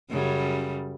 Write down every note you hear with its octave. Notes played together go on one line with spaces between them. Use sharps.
F#2 C#3 G3